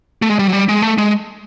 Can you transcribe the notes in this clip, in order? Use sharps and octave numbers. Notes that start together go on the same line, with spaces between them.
A3
G#3
G3
F#3
G3
G#3
A3
G#3